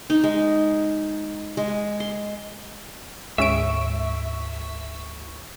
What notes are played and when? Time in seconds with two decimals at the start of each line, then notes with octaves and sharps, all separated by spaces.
0.10 D#4
0.24 G#3
1.57 G#3
2.00 C6
3.38 D2 G#2 G#3 C#4 E5 C#6 D7